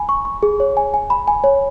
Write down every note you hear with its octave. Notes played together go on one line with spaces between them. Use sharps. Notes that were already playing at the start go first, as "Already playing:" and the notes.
Already playing: G#5 B5
C#6
C#6
G#4
C#5
G#5
G#5
B5
G#5
C#5